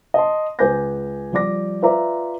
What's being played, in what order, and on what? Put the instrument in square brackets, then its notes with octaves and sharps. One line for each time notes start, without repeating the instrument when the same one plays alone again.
[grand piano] D#5 A5 C6
C#2 B4 G#5 D6 G6 A#6
F3 G3 D5 D6 A#6
F4 B4 D5 E5 A#5 D6